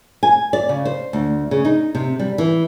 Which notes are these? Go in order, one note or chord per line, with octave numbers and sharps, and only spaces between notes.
G#5
D5
C#3
C5
D2
C#3
D#4
C3
G3
E3